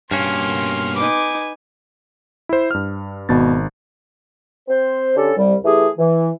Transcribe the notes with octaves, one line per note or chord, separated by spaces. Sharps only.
G2 B2 A#3 C#4 C6 F6
D#4 B4 G#5 D6
E4 C5
G2 F6
G#1 B2 A6
C4 C5
D3 C#4 G4 A4
C2 G3
E3 A3 G4 G#4
E3